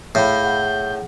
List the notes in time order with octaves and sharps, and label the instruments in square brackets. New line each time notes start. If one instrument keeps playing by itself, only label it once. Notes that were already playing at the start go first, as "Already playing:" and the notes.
[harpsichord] A2 [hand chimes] G#4 F5 B5 [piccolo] G6
[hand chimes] G#4 F#5